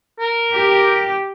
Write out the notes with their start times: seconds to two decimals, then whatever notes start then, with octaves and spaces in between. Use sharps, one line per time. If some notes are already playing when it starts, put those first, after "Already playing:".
0.20 A#4
0.53 G4